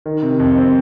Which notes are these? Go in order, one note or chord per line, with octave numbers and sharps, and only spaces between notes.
D#3
C3
F2
C4